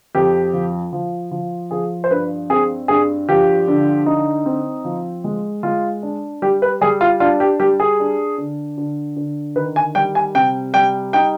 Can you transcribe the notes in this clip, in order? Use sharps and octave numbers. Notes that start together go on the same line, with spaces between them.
F2 G4
F3
F3
F3
F3 G#4
C5
G2 B4
C4 G#4
G2 G#4
F3 G4
D3
D#4
C4
F3
G#3
G#3 F4
D4
G3 G4
B4
G3 G#4
F4
D4 F4
G4
G3 G4
G#4
D4
D3
D3
D3
D#3 B4
G#5
G3 G5
G#5
C3 G5
G3 G5
D#4 G5